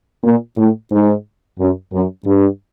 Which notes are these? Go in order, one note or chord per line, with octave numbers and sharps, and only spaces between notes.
A#2
A2
G#2
F#2
F#2
G2